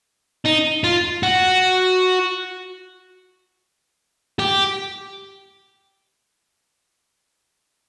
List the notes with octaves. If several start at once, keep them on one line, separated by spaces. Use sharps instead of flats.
D#4
F4
F#4
G4